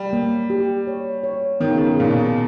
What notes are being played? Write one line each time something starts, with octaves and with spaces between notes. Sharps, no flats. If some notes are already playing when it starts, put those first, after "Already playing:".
Already playing: G3
A#3
G4
C#5
C#5
D#3 B3
C#3
D#3
C#3
A#2 D#4
B2